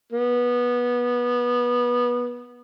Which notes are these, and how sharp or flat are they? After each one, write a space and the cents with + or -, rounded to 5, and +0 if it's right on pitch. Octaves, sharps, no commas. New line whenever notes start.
B3 -20